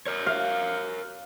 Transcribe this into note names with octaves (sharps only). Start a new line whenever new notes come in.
A#4 C#5
F5